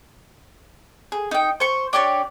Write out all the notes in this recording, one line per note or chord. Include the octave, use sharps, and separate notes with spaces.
G#4
D#4 G5
C5 C#6
D4 G4 C#5 D5